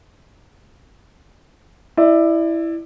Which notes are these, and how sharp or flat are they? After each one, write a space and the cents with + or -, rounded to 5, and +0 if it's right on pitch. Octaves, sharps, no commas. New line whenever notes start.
E4 +0 D5 +25